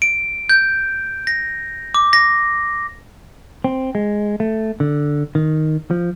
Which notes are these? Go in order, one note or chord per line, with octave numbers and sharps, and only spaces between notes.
D7
G6
A#6
D6
A#6
C4
G#3
A3
D3
D#3
F3